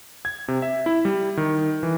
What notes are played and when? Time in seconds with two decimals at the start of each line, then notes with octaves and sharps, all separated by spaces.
0.25 G#6
0.48 C3
0.62 E5
0.86 E4
1.05 G3
1.37 D#3
1.83 E3